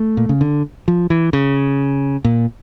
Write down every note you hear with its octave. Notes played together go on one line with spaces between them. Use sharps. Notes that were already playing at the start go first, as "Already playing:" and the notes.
Already playing: A3
A#2
C#3
D3
F3
E3
C#3
A#2